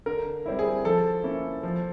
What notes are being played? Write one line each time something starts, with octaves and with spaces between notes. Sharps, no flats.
D3 A#4
G3 C4 E4
G#4
F3 A4
A#3 C#4 E4
F3